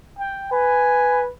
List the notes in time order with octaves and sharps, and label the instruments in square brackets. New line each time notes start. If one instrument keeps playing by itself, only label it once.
[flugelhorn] G5
[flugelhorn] B4 [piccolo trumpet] G#5